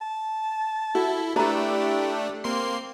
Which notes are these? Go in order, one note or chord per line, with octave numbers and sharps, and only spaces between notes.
A5
E4 F#4 A4
A3 D4 E4 G4 B4 A#5
A#3 C4 C6 C7